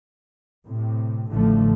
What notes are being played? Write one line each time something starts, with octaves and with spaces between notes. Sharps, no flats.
A2 C3
A1 A2 D3 F3 A3